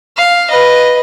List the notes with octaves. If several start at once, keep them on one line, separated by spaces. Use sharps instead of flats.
F5
B4 D#5